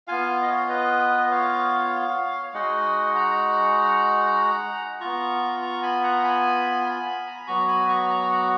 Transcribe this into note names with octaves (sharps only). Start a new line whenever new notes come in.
B3 F4 F5 G#5
D#5
C#5 F5
B4 D#5
C#5 F5
G#3 D#4 F#4 D#5 F#5
F#5 A#5
B3 F4 A#5 C#6
A#5 C#6
G#5 B5
F#5 A#5
G#5 B5
G#5 B5
A#5
B5
F#3 B3 F#4 A#5 C#6
G#5 B5
A#5 C#6
A#5 C#6
F#5 A#5